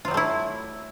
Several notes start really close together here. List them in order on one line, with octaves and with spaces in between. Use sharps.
F4 F#3 G3 A3 E4